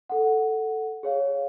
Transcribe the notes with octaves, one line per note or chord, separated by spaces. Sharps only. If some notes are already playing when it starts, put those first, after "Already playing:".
A4 F#5
G#4 C#5 F5